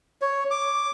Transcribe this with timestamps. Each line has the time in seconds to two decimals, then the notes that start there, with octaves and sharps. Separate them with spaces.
0.22 C#5
0.51 D6